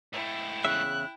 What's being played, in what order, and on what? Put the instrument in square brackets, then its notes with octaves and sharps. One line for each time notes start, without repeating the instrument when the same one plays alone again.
[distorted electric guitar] G#2 A3 [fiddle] E4 G5
[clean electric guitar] E2 C#3 E5 [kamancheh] F#6